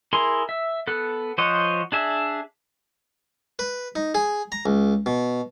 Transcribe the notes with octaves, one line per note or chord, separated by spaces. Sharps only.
E4 G#4 A#4 C6
E5
B3 A4 F#6
F3 C5 C#5 D#5 F#5
D4 G#4 E5
B4
D#4
G#4
A#5
C#2
B2